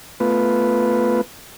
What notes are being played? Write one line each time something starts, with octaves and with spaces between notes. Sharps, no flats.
A3 B3 F4 B4